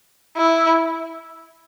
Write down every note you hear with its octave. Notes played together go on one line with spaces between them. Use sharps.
E4